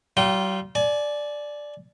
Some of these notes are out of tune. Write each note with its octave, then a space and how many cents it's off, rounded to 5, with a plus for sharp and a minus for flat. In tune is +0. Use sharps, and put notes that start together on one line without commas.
G3 -45 F4 +0 G5 -25
D5 +0 G#5 +35